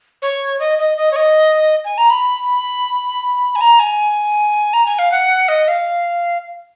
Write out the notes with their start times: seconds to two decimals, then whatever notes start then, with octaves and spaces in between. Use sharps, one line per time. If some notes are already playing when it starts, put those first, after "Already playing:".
0.22 C#5
0.59 D#5
0.78 D#5
0.97 D#5
1.11 C#5
1.16 D#5
1.84 G#5
1.97 A#5
2.10 B5
3.55 G#5
3.61 A#5
3.79 G#5
4.73 A#5
4.86 G#5
4.98 F5
5.11 F#5
5.48 D#5
5.68 F5